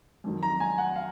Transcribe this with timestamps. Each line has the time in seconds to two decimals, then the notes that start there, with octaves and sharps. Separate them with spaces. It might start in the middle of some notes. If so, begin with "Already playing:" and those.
0.24 F2 D#3 F#3
0.43 A#5
0.60 G#5
0.78 F#5
0.96 F5